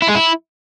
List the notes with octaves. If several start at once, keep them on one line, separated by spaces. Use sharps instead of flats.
E4
G#3
E4